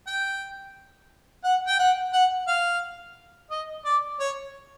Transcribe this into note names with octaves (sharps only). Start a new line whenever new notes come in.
G5
F#5
G5
F#5
F#5
F5
D#5
D5
C#5